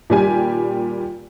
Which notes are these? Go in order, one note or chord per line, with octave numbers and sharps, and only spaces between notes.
A#2 D#3 G3 G4 G#5